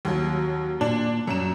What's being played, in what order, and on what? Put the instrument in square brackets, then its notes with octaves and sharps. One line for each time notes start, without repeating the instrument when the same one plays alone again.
[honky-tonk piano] D#2 F#3
[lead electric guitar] A#2 [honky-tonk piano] D4
[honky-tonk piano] F#2 E7 [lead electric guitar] F#3